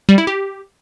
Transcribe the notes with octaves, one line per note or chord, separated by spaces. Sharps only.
G3
E4
G4